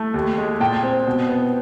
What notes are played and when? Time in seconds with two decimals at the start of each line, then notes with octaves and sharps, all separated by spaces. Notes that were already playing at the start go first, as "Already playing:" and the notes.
Already playing: A3
0.14 D#2
0.38 G#3
0.60 A#2 G5 A5
0.83 C4
1.07 B2
1.29 B3